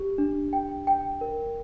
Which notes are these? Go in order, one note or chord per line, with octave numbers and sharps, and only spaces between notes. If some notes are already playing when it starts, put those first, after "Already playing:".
Already playing: G4
D4
G5
G5
A#4